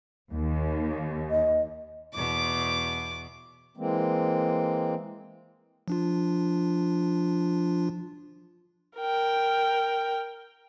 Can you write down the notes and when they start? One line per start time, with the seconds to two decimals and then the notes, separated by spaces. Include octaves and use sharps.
0.33 D#2
1.30 D#5
2.15 E2 B2 D6
3.77 E3 G#3 A#3 C4
5.88 F3 D4 F4
8.98 A#4 G5